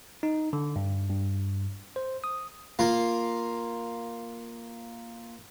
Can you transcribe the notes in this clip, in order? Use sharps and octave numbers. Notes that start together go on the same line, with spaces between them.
D#4
D3
G2
G2
C5
D#6
A#3 F4